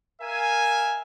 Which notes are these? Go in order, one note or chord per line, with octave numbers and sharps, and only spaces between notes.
A#4 E5 F5 G#5